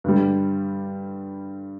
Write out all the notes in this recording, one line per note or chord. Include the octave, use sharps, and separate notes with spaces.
G2 D3 G3